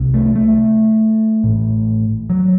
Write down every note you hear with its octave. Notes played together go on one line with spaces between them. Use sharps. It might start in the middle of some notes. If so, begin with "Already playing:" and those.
Already playing: C2 C3
A3
A3
A1 A2
F#3